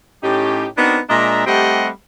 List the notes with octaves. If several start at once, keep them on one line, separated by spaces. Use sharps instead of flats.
A2 C#4 D#4 G4
B3 C4 D4 D#4 F#4 A#4
A#2 G#3 D4 D#5 E5 A#5
G3 A3 C4 G4 D#5 F#5